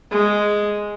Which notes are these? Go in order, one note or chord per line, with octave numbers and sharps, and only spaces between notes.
G#3